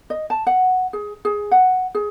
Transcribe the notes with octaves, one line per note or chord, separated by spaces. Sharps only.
D#5
A5
F#5
G#4
G#4
F#5
G#4